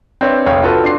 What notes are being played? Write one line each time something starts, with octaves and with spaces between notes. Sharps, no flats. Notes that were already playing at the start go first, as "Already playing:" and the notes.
C4 D4 B4 C#5 E5
F1 A#1 C#5 F5 G5
F4 F#4 A4 B4
D4 C6 C7